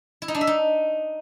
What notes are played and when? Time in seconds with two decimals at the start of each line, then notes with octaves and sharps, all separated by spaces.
0.22 E4
0.28 D#4
0.35 D4
0.41 E5
0.47 D#4